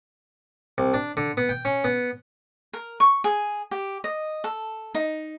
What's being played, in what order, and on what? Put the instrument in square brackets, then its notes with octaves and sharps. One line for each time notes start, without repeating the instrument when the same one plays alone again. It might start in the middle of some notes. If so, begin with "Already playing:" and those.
[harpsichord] C2
D4
D3
B3
G5
C#4
B3
[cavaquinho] A#4
C#6
G#4
G4
D#5
A4
D#4